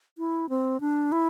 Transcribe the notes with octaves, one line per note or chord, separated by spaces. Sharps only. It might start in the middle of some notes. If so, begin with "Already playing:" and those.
E4
C4
D4
E4